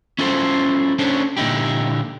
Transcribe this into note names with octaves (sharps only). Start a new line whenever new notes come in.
C#4 E4 F4 A4 A#4 C5
C#4 D4 A4 C5 C#5
A#2 D3 D#4 E4 G4